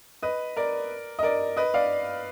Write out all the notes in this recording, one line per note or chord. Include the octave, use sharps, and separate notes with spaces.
B4 D#5
A#4 D5
D#5
A#4 D5
B4 D#5
D5 F5